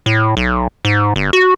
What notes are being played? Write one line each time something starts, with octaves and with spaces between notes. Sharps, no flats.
A2
B1
G#2
G1
F#4